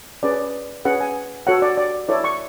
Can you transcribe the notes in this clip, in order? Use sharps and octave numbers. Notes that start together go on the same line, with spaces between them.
C#4 G#4 B4 D5
C#4 G#4 B4 F#5
G#5
F#4 A4 C#5 F#5
D5
D5
E4 A4 C#5 D5
C#6